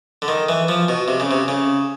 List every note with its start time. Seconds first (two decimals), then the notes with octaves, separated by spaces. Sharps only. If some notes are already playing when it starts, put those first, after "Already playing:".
0.22 D3
0.28 D#3
0.49 E3
0.68 F3
0.88 B2
1.08 C3
1.20 C#3
1.31 C3
1.48 C#3